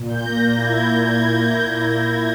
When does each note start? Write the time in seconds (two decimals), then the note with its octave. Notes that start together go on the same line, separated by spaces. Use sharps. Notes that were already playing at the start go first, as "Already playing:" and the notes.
Already playing: A#2
0.10 G6
0.26 A#3 A#6
0.41 A#6
0.57 E4 G#6
0.73 G6
0.89 A#2 G6
1.05 G#6
1.22 A#2 G#6
1.38 G6
1.54 A#3 G6
1.70 G6
1.85 E4
2.07 G#6
2.18 A#2